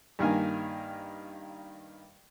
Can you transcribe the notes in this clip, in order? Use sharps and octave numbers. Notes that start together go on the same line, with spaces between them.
G2 D#3 A#3 G#5